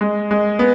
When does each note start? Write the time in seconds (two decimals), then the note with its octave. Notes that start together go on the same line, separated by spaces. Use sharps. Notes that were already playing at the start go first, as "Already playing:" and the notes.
0.01 G#3
0.31 G#3
0.59 B3